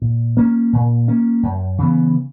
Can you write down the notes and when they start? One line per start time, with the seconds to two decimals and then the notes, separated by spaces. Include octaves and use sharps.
0.02 A#2
0.37 A#3 C#4
0.73 A#2
1.08 A#3 C#4
1.43 F#2
1.78 C#3 E3 B3